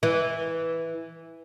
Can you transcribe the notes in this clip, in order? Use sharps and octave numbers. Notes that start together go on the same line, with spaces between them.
E3